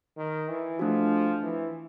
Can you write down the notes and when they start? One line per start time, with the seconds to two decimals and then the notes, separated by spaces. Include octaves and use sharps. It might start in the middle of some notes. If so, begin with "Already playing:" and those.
0.17 D#3
0.48 E3
0.79 F3 A3 D4 F#4
1.42 E3